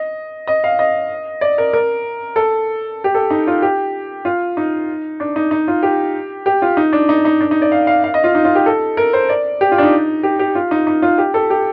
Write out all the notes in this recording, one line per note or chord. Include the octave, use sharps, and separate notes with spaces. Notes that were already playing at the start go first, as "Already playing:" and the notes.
Already playing: D#5
D#5
F5
D#5
D5
A#4
A#4
A4
G4
A4
D#4
F4
G4
F4
D#4
D4
D#4
D#4
F4
G4
G4
F4
D#4
D4
D#4
D#4
D4
D#4
D5
F5
F5
F5
D#5
F4
D#4
F4
G4
A4
A#4
C5
D5
G4
F4
D4
D#4
G4
G4
F4
D#4
D#4
F4
G4
A4
G4